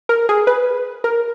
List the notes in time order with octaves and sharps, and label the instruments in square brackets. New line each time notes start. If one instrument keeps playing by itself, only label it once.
[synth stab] A#4
G#4
B4
A#4